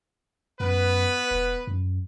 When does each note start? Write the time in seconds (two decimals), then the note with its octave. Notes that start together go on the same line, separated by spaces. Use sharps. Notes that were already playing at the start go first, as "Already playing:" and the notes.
0.60 F#2 B3 B4
1.31 E1
1.67 F#2